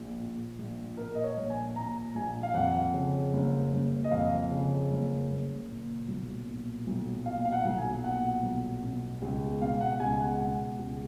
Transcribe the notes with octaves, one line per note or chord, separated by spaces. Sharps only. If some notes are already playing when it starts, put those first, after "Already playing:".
Already playing: A#1
A#2
A#1
A#2 A#4
D#5
C#5
A#1
G#5
A#2 A#5
A#1 G#5
F5
F2 F#5
C#3
F#1
F#1
D#5
F2 F5
C#3
F#1
F#1
A#2
B1
A#2
B1
A#2 F5
F5
F#5
B1
G#5
A#2 F#5
B1
B2
C#2
B2 F5
F#5
C#2 G#5
G#5
F#5
B2
C#2